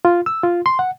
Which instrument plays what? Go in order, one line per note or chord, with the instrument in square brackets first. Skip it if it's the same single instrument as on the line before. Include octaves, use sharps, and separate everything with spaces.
[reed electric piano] F4
E6
F4
C6
F#5